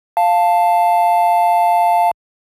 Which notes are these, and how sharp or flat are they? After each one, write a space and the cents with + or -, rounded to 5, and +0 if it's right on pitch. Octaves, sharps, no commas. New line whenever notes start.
F5 +0 A5 +5